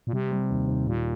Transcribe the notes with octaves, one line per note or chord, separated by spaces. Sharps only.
A#2
C3 G3
G3
D#2
D#2
A#2 G3